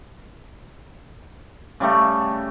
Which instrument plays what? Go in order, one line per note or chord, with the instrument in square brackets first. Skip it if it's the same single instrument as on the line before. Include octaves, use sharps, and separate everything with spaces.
[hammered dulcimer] C#3 G3 A3